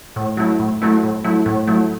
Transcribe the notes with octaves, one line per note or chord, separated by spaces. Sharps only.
A2
F#3 A3 E4
A2
F#3 A3 E4
A2
F#3 A3 E4
A2
F#3 A3 E4